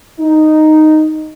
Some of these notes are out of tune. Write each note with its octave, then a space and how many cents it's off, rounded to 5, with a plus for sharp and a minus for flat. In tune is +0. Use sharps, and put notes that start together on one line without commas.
D#4 -5